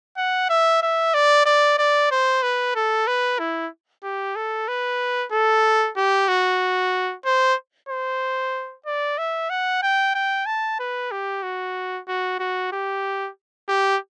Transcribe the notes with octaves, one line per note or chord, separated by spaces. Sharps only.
F#5
E5
E5
D5
D5
D5
C5
B4
A4
B4
E4
G4
A4
B4
A4
G4
F#4
C5
C5
D5
E5
F#5
G5
G5
A5
B4
G4
F#4
F#4
F#4
G4
G4